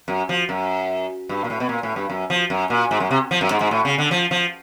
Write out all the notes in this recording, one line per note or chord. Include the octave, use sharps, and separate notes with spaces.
F#2
F3
F#2
G2
A#2
A2
B2
A#2
A2
G2
F#2
F3
F#2
A#2
G#2
F#2
C3
F3
F#2
G#2
G#2
A2
C#3
D3
F3
F3